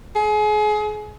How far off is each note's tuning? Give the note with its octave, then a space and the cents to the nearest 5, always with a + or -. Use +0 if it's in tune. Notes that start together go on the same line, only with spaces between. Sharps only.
G#4 +30